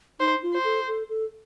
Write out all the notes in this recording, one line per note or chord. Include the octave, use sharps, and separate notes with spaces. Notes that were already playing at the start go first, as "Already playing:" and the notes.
D#4 C5
F4
C5
A4
A4
A4